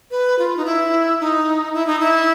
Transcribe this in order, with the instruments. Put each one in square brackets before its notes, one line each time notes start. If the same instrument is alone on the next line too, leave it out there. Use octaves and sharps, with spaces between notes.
[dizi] B4
F4
D#4
E4
D#4
E4
D#4
E4